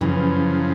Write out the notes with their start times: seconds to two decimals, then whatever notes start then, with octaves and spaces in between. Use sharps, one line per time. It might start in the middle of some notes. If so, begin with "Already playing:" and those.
0.01 F#2 C#3 E3 F3